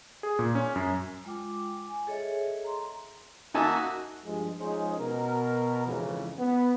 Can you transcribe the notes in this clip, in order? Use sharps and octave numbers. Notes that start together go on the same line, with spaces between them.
G#4
A#2
C#4
F#2
G#3 F4 G5 D6
G#5
G#4 A4 C#5 D#5 E5
A#5 C6
A#3 D#4 F#4 E5 G#5 A5
G2 F3 G#3
F3 G#3 C#4 D#4 G#4 C5
B2 A#4
F2 G#2 C#3 E3
B3